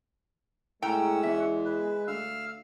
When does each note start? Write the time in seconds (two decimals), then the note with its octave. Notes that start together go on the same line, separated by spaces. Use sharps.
0.82 A2 G#3 C#4 F#5 G5 A#5 E6
1.23 E2 E5
1.65 B4
2.08 D2 F5 E6 F6